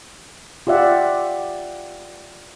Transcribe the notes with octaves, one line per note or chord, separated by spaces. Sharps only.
F4 G4 D5 E5 F#5